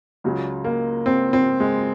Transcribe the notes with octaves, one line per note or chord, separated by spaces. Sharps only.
C#2 C#3 F#3
A#3
C4
C4
G#3